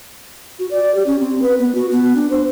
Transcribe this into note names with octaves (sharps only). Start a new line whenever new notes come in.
F#4
D5
G4
C#4
C4
B4
B3
F#4
B3
D4
C5